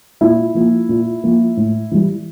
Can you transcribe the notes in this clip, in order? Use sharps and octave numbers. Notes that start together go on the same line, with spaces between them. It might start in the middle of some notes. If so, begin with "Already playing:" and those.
A#2 E4
F3 A#3
A#2
F3 A#3
A2
E3 G3